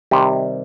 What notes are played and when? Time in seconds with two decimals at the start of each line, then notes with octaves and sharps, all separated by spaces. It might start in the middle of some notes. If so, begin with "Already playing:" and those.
0.11 C3 D#3 G3